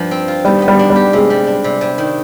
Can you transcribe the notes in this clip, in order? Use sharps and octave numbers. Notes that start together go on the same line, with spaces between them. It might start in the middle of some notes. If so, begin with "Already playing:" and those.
Already playing: G2 F3 F4
C4
F4
D#3 G3
B3
G3
D4
G3
G4
C3 G#3
G3
D4
C3
C3
D#3